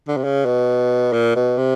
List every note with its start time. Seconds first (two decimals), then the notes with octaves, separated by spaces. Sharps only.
0.08 D3
0.17 C3
0.24 C#3
0.45 B2
1.13 A#2
1.36 B2
1.58 C3